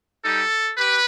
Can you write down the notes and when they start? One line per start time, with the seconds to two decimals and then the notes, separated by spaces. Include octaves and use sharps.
0.23 G3 D#4 G4 A4
0.77 G4 B4